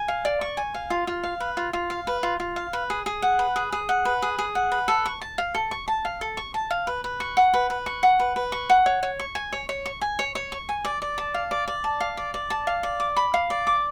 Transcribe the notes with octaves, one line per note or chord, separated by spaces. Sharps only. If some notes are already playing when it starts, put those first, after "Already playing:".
Already playing: G#5
F5
D5
C#6
G#5
F5
F4
F4
F5
B4
F4
F4
F5
B4
F4
F4
F5
B4
G#4
G#4
F#5
B4
G#4
G#4
F#5
B4
G#4
G#4
F#5
B4
A4
C#6
A5
F5
A4
C#6
A5
F5
A4
C#6
A5
F5
B4
B4
C#6
F#5
B4
B4
C#6
F#5
B4
B4
C#6
F#5
C#5
C#5
C#6
G#5
C#5
C#5
C#6
G#5
C#5
C#5
C#6
G#5
D5
D5
A5
F5
D5
D5
A5
F5
D5
D5
A5
F5
D5
D6
B5
F5
D5
D6